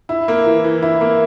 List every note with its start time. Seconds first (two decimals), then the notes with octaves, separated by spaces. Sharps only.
0.09 E4
0.28 A#3
0.46 E3
0.64 E3
0.82 E4
1.01 A#3